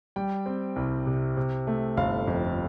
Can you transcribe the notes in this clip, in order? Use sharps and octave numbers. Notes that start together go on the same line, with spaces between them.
G3 G5
C4
C2
C3
C3
A3
G1 F5
F2